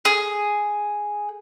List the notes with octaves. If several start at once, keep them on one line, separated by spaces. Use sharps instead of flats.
G#4